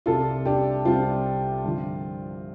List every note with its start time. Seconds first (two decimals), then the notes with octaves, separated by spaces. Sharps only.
0.06 C2 C3 G3 F4 A4
0.45 D4 G4
0.85 C2 C3 G3 C4 F4
1.64 G2 D3 F3